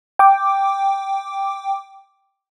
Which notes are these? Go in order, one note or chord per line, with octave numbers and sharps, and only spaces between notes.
G5 D6